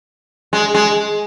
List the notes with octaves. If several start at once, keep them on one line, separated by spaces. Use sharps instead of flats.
G#3
G#3